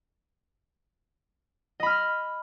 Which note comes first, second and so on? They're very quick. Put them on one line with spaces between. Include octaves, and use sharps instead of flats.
D#5 B5 F6